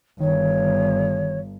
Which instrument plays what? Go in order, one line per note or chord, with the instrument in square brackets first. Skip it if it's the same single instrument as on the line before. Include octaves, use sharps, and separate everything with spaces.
[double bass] G1 [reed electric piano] D#3 [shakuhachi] C#5